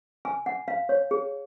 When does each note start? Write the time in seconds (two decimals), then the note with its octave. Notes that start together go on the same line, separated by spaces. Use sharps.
0.25 G#5
0.46 F#5
0.68 F5
0.89 C#5
1.11 G#4